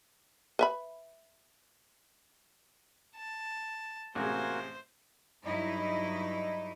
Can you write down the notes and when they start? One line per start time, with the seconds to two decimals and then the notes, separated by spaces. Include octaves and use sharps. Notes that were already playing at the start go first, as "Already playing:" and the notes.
0.59 B4 E5 B5
3.16 A5
4.15 A1 C3 G#3 A#3 F#4 C5 G#5
5.44 G2 F#3 D#4 E4 D#5